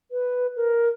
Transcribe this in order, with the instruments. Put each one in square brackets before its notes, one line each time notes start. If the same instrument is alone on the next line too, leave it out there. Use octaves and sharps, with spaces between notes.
[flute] B4
A#4